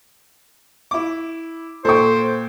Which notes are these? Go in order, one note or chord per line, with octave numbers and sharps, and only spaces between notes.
E4 D6
A#2 A4 C5 G5 C#6